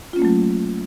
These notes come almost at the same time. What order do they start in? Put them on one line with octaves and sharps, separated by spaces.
F4 C#4 A#3 A3 F#3